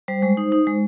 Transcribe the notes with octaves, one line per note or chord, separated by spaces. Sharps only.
G3 C5
G#3
D#4
D#4
G#3